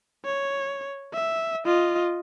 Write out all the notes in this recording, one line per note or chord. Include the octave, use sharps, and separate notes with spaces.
C#5
E5
F4 D#5